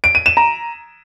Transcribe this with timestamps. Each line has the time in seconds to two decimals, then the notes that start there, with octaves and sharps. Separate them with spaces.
0.04 D7
0.15 D#7
0.26 E7
0.37 A#5